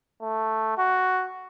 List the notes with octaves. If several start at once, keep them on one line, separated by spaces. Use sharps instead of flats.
A3
F#4